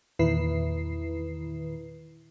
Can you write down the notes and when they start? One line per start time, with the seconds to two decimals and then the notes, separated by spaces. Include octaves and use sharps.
0.19 E2 A#2 D#3 E4 B4 C7